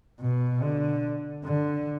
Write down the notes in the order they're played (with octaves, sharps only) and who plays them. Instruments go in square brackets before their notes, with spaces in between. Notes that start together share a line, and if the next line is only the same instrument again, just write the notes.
[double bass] B2
D3
D3